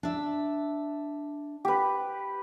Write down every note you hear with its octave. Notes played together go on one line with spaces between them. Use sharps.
D4 E5
G4 B4